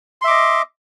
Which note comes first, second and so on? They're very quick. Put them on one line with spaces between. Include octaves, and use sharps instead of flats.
C6 E5 D6 D#5